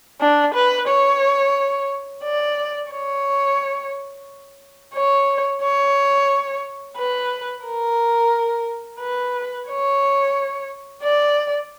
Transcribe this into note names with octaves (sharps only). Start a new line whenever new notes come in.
D4
B4
C#5
D5
C#5
C#5
C#5
B4
A#4
B4
C#5
D5